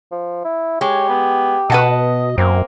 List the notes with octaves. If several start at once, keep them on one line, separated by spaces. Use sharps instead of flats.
F3
E4
G#3 G4 C#5
B3
B2 B4 D#5 F#5 A5
F#2 A#3 C4